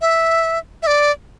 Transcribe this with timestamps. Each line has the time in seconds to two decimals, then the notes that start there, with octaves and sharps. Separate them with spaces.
0.01 E5
0.83 E5
0.87 D5